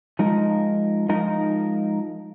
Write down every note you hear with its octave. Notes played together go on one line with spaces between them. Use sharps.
F3 G#3 D#4 A#4
F3 G#3 D#4 A#4